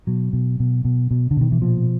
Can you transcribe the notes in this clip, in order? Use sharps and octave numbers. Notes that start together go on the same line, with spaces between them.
B2 F#3
B2
B2
B2
B2
D3
B2 D#3
E3
A#2 F3